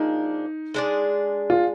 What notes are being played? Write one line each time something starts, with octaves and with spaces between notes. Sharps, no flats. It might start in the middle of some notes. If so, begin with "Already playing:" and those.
Already playing: F3 A#3 D4 D#4 G#4
G#3 D4 G#4 D5
F4